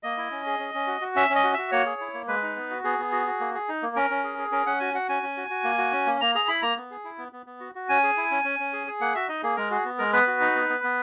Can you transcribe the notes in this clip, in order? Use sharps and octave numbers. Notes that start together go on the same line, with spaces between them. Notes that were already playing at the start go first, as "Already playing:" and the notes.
A#3 D#5
E4
C#4
G#4
C#4
C#4
F#4
F#4
C#4 E5
C#4
D#5
F#4
F#4 E5
A#3 C#5
G#4
E4
A#3
G#3 B4
D#4
B3
F#4
B3 G#4
B3
F#4
F#4
A#3
G#4
D#4
A#3
C#4 A#4
C#4
G#4
G#4
C#4 A#4
C#4 F#5
F#4 G#5
F#4 F#5
C#4 G#5
C#4
F#4
F#4
A#3
F#4
C#4
A#3
A#3 A#5
G#4 A#5
E4 B5
A#3 A#5
B3
G#4
E4
B3
B3
B3
F#4
F#4
C#4 G#5
G#4
E4
C#4
C#4
C#4
G#4
G#4
A#3 F#5
F#4 E5
D#4 D#5
A#3 G#4
G#3 A#4
F#4 G#4
B3
G#3 A#4
B3 B4
F#4
D#4
B3
B3
B3